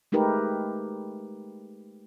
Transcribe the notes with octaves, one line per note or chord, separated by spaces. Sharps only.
G#3 A3 D#4 G4 A#4 B4